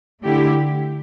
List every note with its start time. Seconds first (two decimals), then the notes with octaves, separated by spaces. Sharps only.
0.24 D3 A3 E4 G4